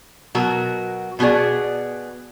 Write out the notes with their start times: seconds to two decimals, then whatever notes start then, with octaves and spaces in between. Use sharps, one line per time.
0.35 B2 F#3 F#4 A#4
1.19 B2 B3 F#4 G#4 D5